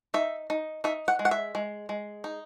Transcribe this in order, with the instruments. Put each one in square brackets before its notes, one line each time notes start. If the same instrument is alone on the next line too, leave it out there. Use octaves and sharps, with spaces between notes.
[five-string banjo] D#4 E5
D#4
D#4 E5
F#5
G#3
F#5
E5
G#3
G#3
D#4